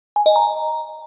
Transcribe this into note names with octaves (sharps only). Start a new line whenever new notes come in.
G#5
D#5
A#5